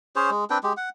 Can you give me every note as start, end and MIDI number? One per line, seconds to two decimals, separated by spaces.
0.16 0.30 61
0.16 0.30 68
0.16 0.30 72
0.16 0.30 73
0.31 0.44 56
0.50 0.58 60
0.50 0.58 62
0.50 0.58 71
0.50 0.58 79
0.63 0.73 56
0.63 0.73 67
0.77 0.89 78